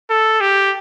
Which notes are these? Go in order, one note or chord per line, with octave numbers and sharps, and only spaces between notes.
A4
G4